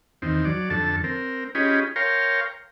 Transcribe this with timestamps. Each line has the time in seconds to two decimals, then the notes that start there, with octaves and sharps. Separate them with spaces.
0.22 E2 D#3 C4
0.45 F#3 D5
0.70 F2 D3 A4 A5
1.04 C4 A#4
1.55 C#4 F4 G4 G#4 D#5 B5
1.96 A#4 C#5 F5 G5 A#5 C6